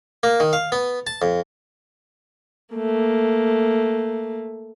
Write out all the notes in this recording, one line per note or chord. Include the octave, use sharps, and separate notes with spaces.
A#3
D#3
F5
B3
A5
F2
A3 A#3